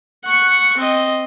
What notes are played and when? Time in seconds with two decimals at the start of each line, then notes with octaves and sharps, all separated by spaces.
0.24 F#5 C#6
0.77 C4 D#5